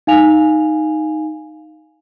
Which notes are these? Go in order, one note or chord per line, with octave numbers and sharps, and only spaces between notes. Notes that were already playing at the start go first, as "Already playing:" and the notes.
D#4 F5 G#5 F7